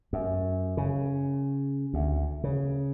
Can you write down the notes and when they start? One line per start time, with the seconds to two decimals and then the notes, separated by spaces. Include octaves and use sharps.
0.13 F#2
0.77 C#3
1.94 D2
2.44 C#3